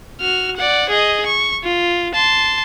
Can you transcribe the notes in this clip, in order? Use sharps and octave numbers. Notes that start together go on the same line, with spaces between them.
F#4 F6
D5 F#5
G#4 D#5
C#6
F4
A5 C6